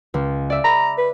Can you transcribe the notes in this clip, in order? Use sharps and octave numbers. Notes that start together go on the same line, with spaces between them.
C#2
D5 E5
A#5 B5
B4